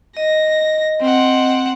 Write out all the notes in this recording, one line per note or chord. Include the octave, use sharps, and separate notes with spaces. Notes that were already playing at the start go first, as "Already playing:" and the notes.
D#5 A#6
C4 F#5